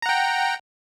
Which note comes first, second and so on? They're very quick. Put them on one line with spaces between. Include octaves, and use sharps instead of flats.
A#5 F#5 G5